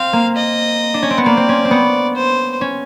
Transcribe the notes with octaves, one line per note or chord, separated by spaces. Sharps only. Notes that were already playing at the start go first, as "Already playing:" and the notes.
Already playing: C4 F5
A#3
D#5
D4
C#4
C4
B3
A#3 D5
C4
C#4
C4
B3
C5
C#4